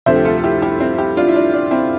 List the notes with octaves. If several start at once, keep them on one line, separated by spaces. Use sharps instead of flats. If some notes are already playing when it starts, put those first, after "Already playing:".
D2 C3 F3 A3 C5 E5
G4
F4 A4
A4
E4 G4
E4 G4
C4 E4
E4 G4
D4 F4
E4
D4
D4
C4 E4